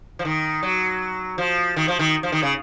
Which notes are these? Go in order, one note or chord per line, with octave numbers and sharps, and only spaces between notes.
F3
D#3
F#3
F3
D#3
F3
D#3
F3
D#3
C#3